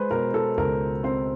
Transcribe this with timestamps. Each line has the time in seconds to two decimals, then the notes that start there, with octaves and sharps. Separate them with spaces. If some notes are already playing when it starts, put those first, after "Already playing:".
Already playing: G#3 B4 C5
0.11 B2 A#4
0.34 A4
0.57 C#2 A#4
1.03 C4 C5